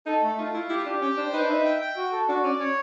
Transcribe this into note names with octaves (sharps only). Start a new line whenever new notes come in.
D#4 A4
A3
D#4 F4
E4 F4
E4 G4
D4 G4
C#4 G5
D4 C5
D#4 B4
D4
D#4 E5
G5
G5
F#4
A4
D4 F#4
C#4 D5
C#4 C#5